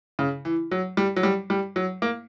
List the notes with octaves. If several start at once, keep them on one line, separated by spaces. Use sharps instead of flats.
C#3
E3
F#3
G3
F#3
G3
G3
F#3
A#3